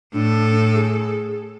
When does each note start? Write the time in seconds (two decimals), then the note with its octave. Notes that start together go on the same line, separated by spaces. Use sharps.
0.14 A2 D4 A4
0.75 G#4